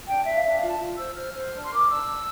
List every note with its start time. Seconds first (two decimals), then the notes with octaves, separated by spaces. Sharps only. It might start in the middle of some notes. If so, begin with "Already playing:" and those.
0.07 D4 G5
0.25 D4 E5
0.35 F5
0.44 D4 E5
0.56 F5
0.63 F4 A5
0.80 F4
0.98 C5 E6
1.16 C5 F6
1.35 C5
1.53 D4
1.64 C6
1.71 A#4 D6
1.88 D4 E6
2.07 D4